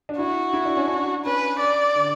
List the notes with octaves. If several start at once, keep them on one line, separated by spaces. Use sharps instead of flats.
D4
E4 F#4
E4
D4
C#4
D4
C#4 B4
D5
D3